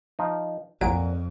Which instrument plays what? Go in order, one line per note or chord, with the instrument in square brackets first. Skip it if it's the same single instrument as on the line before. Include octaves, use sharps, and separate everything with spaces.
[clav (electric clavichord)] F3 D#4
[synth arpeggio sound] A#1 F#3 D7 [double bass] F2 [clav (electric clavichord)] A#2 F#5 A#5